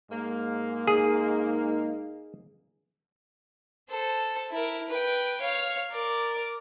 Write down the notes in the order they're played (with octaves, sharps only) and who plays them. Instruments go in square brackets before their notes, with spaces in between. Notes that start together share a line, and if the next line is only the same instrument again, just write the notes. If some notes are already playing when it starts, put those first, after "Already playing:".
[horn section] G#2 A#3
[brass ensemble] D#4 [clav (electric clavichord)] G#4
[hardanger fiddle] A4 C5
E4 A#4
B4 G5
C#5 F5
A#4 D5